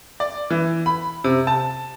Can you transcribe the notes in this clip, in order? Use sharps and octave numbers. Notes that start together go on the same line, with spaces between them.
D5
E3
B5
C3
A5